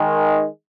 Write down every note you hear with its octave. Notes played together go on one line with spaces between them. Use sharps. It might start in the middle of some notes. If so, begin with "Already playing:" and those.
Already playing: D#3 G#3